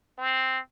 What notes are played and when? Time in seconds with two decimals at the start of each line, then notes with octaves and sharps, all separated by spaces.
0.18 C4